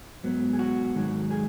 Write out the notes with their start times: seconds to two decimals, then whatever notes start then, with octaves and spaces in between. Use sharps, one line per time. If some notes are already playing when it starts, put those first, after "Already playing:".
0.24 G#2 F#3 B3
0.53 G#4
0.59 F#4
0.95 G#2 D#3 F#3
1.31 G#4